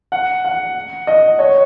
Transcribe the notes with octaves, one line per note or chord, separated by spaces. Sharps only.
F#5
F#5
D#5
C#5